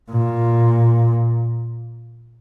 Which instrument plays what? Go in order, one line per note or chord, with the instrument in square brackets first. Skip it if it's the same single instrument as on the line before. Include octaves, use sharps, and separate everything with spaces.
[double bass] A#2